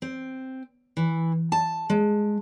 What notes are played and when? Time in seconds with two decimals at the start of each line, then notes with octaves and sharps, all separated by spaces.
0.02 C4
0.97 E3
1.52 A5
1.90 G#3